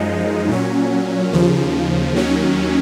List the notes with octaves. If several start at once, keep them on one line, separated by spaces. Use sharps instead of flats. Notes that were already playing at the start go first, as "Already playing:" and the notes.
Already playing: F#2 F3 G#3 D#4
A#2 F#3 C#4
D#2 C#3 F3
D#2 D#3 F#3 C#4